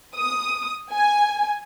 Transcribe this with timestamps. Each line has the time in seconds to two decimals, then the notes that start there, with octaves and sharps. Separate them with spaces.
0.15 D#6
0.92 G#5